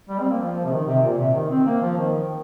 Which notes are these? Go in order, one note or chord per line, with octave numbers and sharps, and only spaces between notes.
G3
C4
A#3
F3
C3
D#3
C3
A#2
C3
D#3
C4
A#3
F3
D#3